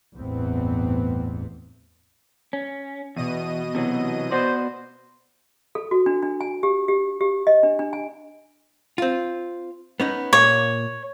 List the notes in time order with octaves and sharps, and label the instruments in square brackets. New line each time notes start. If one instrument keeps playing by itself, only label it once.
[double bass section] A1 E2 G2 B3 C4
[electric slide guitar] C#4
[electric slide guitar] E2 [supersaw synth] B2 D#5 D#7
[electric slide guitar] C3 E3 F#3
[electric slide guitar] B3 F#4 D5 [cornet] C5
[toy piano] A4
F#4
D4
D4
G#5
G4
G4
G4
D#5
D4
D4
G#5
[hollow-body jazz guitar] C4 F4
B3 C#4 D#4
[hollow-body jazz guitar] A#2 A#3 [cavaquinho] C#5